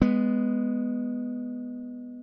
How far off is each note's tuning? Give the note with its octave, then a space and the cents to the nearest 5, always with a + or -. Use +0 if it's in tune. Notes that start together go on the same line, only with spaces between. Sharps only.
G#3 +0 B3 +0